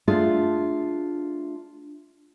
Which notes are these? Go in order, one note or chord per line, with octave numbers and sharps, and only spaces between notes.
A3 D4 F4 G#4 D5 E5